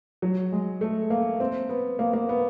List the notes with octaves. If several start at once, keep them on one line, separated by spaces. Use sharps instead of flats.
F#3
G#3
A3
A#3
C4
B3
A#3
A#3
B3